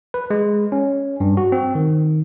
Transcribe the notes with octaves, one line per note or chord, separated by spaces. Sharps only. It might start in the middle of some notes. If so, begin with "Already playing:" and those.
B4
G#3
C#4
G2
F#4
C4
D#3